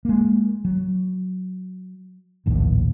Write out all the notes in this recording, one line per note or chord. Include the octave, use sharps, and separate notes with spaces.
G#3 A#3
F#3
A#1 D#2 A2